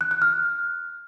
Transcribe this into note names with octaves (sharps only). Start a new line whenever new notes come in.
F#6
F#6
F6